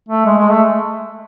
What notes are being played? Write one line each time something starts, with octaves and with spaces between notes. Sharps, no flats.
A3
G#3
G#3
A3